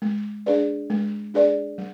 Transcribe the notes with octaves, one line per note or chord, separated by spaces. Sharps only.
G#3
D4 G#4 B4 D5
G#3
D4 G#4 B4 D5
G3